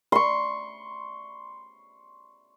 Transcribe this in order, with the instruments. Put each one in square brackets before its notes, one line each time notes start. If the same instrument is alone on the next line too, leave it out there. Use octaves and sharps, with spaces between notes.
[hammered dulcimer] C6 C#6